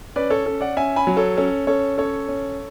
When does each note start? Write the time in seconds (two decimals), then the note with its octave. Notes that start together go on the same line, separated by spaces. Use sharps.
0.16 C#4 B4 D5
0.30 A4 C#5
0.45 C#4 A4
0.61 D5 F#5
0.76 C#4 E5 G#5
0.96 G#5 B5
1.07 F#3
1.17 A4 C#5
1.37 C#4 A4
1.67 C#4 A4 C#5
1.98 C#4 A4 C#5
2.28 C#4